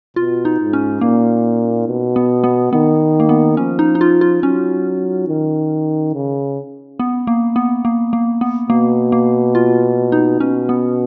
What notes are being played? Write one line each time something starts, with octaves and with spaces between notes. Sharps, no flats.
B2 F4
D#4
G#2
C#4
A#2 A#3
B2
B3
B3
D#3 B3
A#3
B3
F3 C#4
D#4
D#4
F4
F4
F#3 C#4
D#3
C#3
B3
A#3
B3
A#3
A#3
B3
B2 A#3
A#3
F4
D#4
B2 C#4
B3